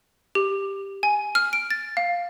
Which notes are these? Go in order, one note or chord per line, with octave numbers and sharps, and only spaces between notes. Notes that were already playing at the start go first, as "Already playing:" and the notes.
G4
G#5
F6
D7
A6
F5